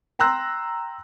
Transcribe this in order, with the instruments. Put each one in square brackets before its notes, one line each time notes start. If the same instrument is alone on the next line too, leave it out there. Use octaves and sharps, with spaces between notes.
[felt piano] G5 A#5 C6 E6 F#6 A#6